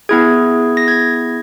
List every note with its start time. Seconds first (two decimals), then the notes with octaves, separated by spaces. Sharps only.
0.09 B3 E4 G#4 G#6
0.77 A#6
0.88 G#6